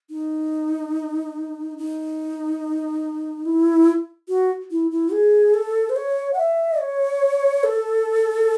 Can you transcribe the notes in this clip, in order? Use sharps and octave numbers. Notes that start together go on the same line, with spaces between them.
D#4
D#4
E4
F#4
E4
E4
G#4
A4
C5
C#5
F#5
E5
C#5
A4